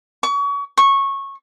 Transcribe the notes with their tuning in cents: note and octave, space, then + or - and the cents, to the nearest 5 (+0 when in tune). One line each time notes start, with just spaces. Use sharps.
C#6 +35
C#6 -15